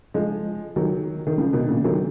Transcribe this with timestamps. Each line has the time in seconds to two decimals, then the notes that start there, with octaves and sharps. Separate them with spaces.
0.14 F3 G#3
0.76 D#3 F#3
1.27 D#3
1.38 C#3 F3
1.53 B2 D#3
1.69 A#2 C#3
1.84 D#3 F#3